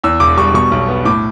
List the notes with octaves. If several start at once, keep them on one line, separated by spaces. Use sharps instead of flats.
E2 E6
E1 D6
G3 C#6
B2 C#6
B1
B3
A2 D6